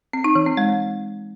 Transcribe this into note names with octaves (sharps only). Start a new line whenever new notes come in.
C4
D#4
E3
C4
G#3